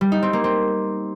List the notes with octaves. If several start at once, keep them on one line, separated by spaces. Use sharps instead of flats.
G3
D#4
C4
A#3
C4